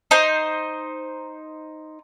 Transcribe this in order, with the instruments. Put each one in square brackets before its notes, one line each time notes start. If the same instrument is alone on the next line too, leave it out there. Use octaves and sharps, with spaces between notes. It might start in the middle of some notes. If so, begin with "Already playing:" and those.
[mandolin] D#4 C5